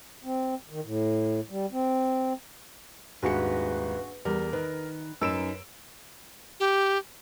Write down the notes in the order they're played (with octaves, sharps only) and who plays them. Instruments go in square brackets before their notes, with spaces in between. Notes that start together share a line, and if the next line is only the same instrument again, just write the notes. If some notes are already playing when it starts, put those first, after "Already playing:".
[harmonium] C4
D#3
A2
G3
C4
[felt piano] D#1 G#2 C#7 [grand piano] D4 F#4 G#4 [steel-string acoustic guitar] B4
[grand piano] E2 [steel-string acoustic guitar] G3 [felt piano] A#4
[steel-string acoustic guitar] D#3 [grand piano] B4
[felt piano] F#2 [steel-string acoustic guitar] D#4 B4 [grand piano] E6 D7 E7
[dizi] G4